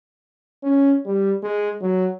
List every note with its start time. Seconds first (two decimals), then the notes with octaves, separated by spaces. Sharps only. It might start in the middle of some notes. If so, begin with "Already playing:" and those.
0.63 C#4
1.06 G3
1.43 G#3
1.81 F#3